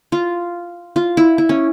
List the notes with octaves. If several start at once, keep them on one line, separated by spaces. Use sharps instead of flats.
F4
F4
E4
E4
C#4